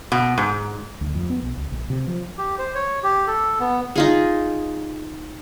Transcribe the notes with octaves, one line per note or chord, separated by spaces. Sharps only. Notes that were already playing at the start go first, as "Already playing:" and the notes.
B2
G#2
D2
F2
B3
B1
C#2
A#1
C3
F3
G4
C5
C#5
G4
A4
B3
D#4 F4 G#4